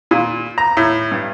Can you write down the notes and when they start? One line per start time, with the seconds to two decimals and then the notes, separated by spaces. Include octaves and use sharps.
0.11 A#2
0.58 A#5
0.77 A2
1.11 G2